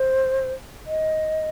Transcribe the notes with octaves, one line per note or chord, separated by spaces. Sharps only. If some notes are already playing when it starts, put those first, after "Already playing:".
Already playing: C5
D#5